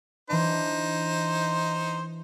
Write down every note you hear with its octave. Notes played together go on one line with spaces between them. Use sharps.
E3 D4 D#4 C5